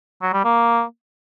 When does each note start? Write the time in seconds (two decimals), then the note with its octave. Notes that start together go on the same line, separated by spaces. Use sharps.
0.22 F#3
0.33 G3
0.44 A#3